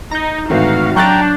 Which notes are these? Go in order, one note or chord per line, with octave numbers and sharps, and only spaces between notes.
D#4 A#5 G6
G#1 A2 E3 F#4 F5
F#3 D4 G5 A#5 C#6 F#6 G6 A6